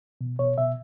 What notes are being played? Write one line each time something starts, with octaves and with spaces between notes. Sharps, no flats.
B2
B2 C#5
B2 E5